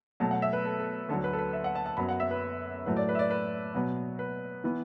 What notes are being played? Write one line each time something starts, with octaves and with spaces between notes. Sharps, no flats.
B2 F#3 A3 A5
F#5
E5
B4
A4
A4
D2 D3 F#3 A4
B4
A4
B4
E5
F#5
A5
A5
F#2 F#3 B3 B5
F#5
E5
B4
A2 F#3 A3 B4
D5
B4
E5
D5
B4
B2 F#3 B3
B4
E3 B3